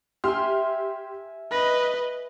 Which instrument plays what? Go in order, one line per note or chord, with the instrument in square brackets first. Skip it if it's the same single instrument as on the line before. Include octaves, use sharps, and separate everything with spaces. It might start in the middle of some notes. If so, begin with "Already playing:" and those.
[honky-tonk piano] G4 C6 F6 [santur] E5 G#5
[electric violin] B4 D#5 [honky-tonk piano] A#6